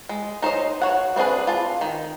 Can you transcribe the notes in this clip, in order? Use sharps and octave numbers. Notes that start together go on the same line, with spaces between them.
G#3
D#4 C5 C#5 D#5
F#4 C#5 F#5
B3 C4 D4 G#4 B4
F4 A5
D#3